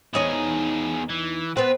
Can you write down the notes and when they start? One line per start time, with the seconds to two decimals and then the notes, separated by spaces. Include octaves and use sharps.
0.14 E2 B2 D#4 G#4 C#5
1.10 E3
1.57 B3 C4 B4